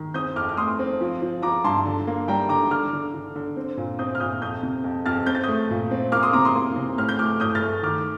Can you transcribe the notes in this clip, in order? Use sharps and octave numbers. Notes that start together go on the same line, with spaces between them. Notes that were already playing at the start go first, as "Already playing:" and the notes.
Already playing: D#3
C4 D#6 G6
F2 D6 F6
F6
A3 C6 D#6
C4
F3
F3
F3 A#5 D6
G2 A5 C6
D3
A#3
G3 G5 A#5
D3 A#5 D6
D3 D6 F6
D3
D3
D3
C4
A#2
C4 D#6 G6
F6
A#2 D#6 G6
F2 D#6 G6
C3
F2
F2 F6 A6
C4 G6
A6
A3 D#6 G6
A#2
C4
A#3 D6 F6
C6 D#6
C3 A#5 D6
C6 D#6
A#3
C3
A2 F6
G6
A3 D6 F6
A2 D#6 G6
F6 A6
A3
D#3 D6 F6